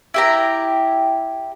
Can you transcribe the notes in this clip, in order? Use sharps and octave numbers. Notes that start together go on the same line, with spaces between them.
E4 G4 A#5